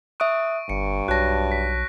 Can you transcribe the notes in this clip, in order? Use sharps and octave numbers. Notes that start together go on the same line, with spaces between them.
E5 C#6 D#6 F#6 D7
G1 G2 C#7
B1 F#4 C#5 A5 F#6 A#6
B6